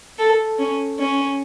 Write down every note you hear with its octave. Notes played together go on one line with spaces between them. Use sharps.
A4
C#4
C#4